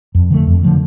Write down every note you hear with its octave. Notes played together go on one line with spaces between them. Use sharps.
F2
D3 F3 A3
F2
D3 F3 A3